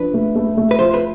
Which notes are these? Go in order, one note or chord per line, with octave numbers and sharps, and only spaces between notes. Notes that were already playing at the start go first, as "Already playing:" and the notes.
Already playing: F3 D4 B4
A3
A3
A3
B4
F3 C5
B4